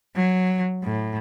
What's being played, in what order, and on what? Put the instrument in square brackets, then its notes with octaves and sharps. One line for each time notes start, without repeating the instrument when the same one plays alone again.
[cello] F#3
A2